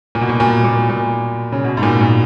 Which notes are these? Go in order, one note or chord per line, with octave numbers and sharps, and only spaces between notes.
A#2
B2
A#2
A#2
A#2
A#2
C#3
B2
G#2
A#2
A#2